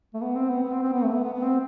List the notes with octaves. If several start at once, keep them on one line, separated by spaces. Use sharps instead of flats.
A3
B3
C4
B3
B3
C4
C4
B3
A3
B3
B3
B3
C4